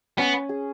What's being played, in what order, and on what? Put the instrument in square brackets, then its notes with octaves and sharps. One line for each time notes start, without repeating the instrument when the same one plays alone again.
[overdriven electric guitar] B3 [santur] C#4
[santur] G#4